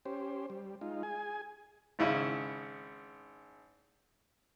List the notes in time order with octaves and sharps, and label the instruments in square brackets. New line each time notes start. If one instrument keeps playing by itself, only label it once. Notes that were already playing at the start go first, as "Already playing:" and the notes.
[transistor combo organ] C#4 G4 C5
G3
G#3 D#4 F4
G#4 G#5
[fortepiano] G#1 C#3 E4